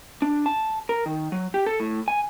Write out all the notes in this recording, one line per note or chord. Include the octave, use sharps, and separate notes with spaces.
D4
A5
A#4
D#3
F#3
G4
A4
A2
G#5